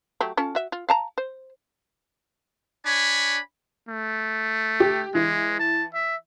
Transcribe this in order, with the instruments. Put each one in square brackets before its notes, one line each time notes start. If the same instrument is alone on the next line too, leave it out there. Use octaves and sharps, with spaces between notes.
[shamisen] F#3 A3 G4
C#4 F4 A4
F#4 E5
F4
F5 A5 A#5
C5
[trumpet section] D4 C#5 G#5 B5
[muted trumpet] A3
[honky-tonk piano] G4
[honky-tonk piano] E3 [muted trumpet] G#3
[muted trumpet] A5
E5